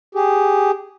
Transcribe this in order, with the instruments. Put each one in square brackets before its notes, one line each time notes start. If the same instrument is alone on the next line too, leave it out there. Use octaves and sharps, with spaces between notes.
[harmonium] G4 G#4